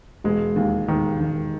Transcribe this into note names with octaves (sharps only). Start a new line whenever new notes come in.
E1 G#3
D#2
E1 D#3
D#3